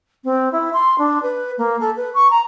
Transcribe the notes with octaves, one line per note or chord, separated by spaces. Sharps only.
C4
E4
C6
D4
B4
A#3
A4
B4
C#6
A#5